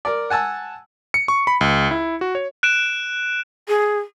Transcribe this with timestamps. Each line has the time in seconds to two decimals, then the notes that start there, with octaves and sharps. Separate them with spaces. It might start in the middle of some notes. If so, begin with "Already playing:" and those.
0.05 A#4 D5
0.30 F#5 G#5 A5 E6
1.14 C#7
1.28 C#6
1.47 B5
1.61 C#2
1.91 E4
2.21 F#4
2.35 C#5
2.63 F#6 D7 E7
3.68 G#4